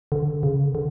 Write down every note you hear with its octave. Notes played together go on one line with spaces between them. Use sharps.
D3
C#3
D3